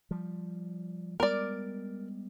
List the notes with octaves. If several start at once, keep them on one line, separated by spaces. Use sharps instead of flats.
F3 G3
G3 G#3 B3 A#4 D5